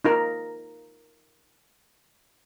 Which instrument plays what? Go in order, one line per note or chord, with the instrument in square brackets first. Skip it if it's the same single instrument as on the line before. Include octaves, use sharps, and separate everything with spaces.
[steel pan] D#4 F4 A#4